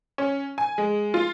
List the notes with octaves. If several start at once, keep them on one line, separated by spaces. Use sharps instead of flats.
C#4
G#5
G#3
F4